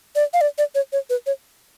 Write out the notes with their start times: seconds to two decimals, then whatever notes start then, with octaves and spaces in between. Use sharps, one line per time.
0.16 D5
0.34 F5
0.41 D5
0.58 D5
0.75 C#5
0.93 C#5
1.10 B4
1.26 C#5